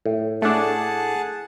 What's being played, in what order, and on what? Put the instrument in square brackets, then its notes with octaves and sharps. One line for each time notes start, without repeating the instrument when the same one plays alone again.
[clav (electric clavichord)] A2
[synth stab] A3 D4 [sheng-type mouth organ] G#4 F#5 A5